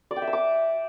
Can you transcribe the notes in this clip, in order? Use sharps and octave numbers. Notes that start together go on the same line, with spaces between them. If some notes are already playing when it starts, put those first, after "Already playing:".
D5
G5
E5
E6
D6